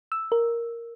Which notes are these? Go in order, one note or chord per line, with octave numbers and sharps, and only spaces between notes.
E6
A#4